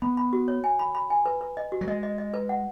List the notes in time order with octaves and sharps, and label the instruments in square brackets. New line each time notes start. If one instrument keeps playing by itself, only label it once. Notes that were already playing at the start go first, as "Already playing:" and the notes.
[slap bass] B3 [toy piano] B5
[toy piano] B5
F#4
C#5
G#5
B5
B5
G#5
B4
B4
D#5
F#4
[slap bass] F#3
[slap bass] G#3 [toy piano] D#5
[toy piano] D#5
D#5
B4
F#5